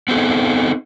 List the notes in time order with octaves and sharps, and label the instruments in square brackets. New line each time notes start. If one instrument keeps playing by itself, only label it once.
[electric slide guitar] B3 C4 D#4 G#4 A4